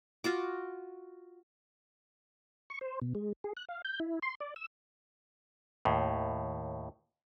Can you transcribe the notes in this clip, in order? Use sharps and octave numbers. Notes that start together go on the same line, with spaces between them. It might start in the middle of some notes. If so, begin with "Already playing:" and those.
F4 F#4 D6
C#6
C5
B2
G#3
G#4
F#6
F5
G6
E4
C6
D5
E6
D#2 A2